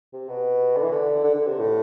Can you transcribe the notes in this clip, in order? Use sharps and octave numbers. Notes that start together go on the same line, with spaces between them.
C3
B2
D3
E3
D3
D3
D3
C3
A2